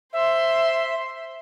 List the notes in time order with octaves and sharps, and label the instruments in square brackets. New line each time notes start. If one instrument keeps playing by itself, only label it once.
[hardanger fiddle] C5 C6 [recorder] E5